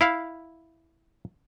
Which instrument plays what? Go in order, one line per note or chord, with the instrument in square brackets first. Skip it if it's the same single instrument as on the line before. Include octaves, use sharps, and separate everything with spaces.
[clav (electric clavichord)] E4 F5